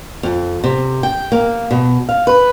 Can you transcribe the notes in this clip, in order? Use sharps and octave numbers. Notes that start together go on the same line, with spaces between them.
F2
C3
G5
A#3
B2
F5
B4